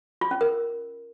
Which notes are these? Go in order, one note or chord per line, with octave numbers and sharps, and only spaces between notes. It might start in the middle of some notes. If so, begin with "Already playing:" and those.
F4
C#4
A#4